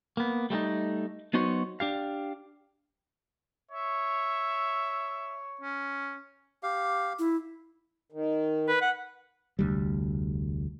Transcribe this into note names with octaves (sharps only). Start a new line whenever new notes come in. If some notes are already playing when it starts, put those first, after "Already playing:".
A#3 B3
G3 A3 C4 D#4
F#3 B3 D#4 F#4 C5 C#5
D4 G4 F5
C#5 E5
C#4
G4 F5
E4
D#3
B4
F#5
F1 D2 G3